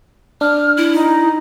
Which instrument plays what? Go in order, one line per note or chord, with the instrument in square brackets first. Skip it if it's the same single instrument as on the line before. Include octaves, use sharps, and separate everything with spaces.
[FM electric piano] D4 [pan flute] F6
[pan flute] E4
[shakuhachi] D#4